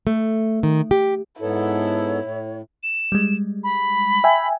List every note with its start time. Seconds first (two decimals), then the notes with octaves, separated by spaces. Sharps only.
0.07 A3
0.63 D#3
0.91 G4
1.41 G#2 B3 E4 A4 C#5
2.21 A2
2.83 E7
3.12 G3 G#3
3.64 B5
4.24 E5 G5 G#5